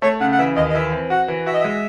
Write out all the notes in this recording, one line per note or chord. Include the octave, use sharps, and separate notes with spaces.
A3 C#5
C#3 F#5
F#5
E3 E5
D#2 D#5
D#5
E3 E5
C4
F#4 F#5
E3
F#4 E5
D#5
G#3 E5